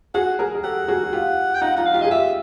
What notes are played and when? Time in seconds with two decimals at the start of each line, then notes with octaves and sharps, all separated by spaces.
0.14 F#4 G#4 F#5
0.39 G#4 A#4
0.55 G#4
0.64 G4 A4 F#5
0.88 F#4 G#4
1.03 F#4
1.13 F4 G4
1.55 G5
1.61 D#4 F4 F#5
1.76 D#4 F4 F#5
1.86 F5
1.94 F4 G4
2.02 G#4 D#5
2.11 F4 G4 E5